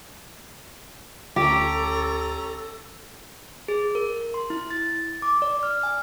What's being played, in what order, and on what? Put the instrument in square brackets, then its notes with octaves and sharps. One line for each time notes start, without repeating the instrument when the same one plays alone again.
[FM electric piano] D2 [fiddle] C#4 A#5 [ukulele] G4 [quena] A4
[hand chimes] G#4
A#4
C6
E4
A6
D6
D5
F6
G#5